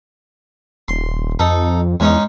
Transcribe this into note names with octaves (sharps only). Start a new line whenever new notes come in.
D#1 C6
F2 D#4 A4
E2 G#2 C#4 D#4